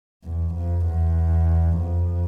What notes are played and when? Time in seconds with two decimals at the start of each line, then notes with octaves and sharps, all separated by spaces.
0.24 E2
0.55 F2
0.86 E2
1.80 F2